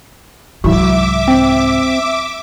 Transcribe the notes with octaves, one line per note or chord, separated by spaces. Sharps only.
C2 G#2 E3 F#3 E5 D6
C4